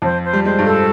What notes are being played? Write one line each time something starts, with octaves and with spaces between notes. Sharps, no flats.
F2 F3 C5
C5
G3
G#3 C5
G2 G3
A4